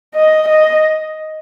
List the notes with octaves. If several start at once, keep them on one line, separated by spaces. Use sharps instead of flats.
D#5
D#5